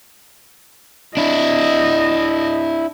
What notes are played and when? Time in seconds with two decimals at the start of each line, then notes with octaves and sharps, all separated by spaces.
1.17 D4 E4 D#5